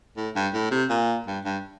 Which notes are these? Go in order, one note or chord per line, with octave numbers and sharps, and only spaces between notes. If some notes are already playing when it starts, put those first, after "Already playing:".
A2
G2
A2
C3
A#2
G2
G2